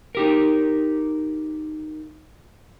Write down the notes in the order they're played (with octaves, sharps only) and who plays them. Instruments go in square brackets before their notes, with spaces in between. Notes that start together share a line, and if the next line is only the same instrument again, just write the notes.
[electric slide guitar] D#4 G4 A#4